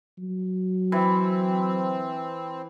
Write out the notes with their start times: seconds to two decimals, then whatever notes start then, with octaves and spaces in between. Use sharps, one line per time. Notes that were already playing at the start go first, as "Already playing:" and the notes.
0.18 F#3
0.92 E3 C4